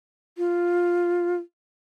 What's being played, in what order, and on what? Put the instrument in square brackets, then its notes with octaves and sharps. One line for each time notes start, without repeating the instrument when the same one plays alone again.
[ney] F4